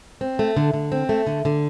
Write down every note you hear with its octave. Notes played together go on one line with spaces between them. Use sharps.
C4
A3
D3
D3
C4
A3
D3
D3